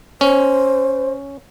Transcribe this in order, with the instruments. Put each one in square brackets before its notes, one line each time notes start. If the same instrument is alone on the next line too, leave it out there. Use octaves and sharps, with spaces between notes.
[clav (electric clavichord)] C#4 [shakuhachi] C5